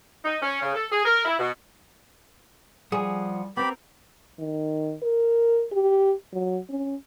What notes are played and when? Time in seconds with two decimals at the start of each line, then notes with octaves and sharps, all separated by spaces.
0.25 D#4
0.42 C#4
0.62 C#3
0.74 A4
0.92 G#4
1.05 A#4
1.25 E4
1.39 B2
2.92 F3 G3 G#4 F#5 D#6
3.57 B3 C4 G4 A#4 B5
4.39 D#3
5.03 A#4
5.72 G4
6.32 F#3
6.70 C#4